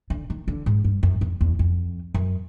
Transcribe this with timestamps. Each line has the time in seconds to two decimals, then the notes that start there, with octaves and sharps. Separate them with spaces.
0.10 D3
0.30 D#3
0.48 D3
0.66 G#2
0.84 G2
1.03 F#2
1.21 F2
1.41 E2
1.59 F2
2.14 F#2